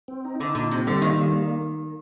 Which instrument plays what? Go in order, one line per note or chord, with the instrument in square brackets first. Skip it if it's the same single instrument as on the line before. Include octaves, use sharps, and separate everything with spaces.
[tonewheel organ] C4
D#4
[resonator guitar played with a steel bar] D3 [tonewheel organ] D#4
[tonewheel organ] A#2 [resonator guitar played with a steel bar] D3
[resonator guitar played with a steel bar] C3 [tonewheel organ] C4
[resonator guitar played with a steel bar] D3 [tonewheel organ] G3
[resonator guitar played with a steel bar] D#3 [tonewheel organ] A#3
[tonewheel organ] G3
A#3